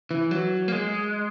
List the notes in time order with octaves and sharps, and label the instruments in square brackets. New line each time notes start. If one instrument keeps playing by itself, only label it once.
[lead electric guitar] E3
F#3
A#3
G#3